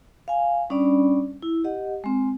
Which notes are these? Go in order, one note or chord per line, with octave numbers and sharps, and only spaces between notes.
F5 G#5
G3 C#4 D4 D5 B5
E4
G4 D#5 F#5
G#3 C4